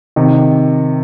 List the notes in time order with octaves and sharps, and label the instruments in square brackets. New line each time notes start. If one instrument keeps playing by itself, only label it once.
[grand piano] C3 D#3